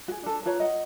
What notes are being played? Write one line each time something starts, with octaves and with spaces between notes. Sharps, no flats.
F#4 G#4
D4 A4
F4 B4 C#5 A#5
D#5 F#5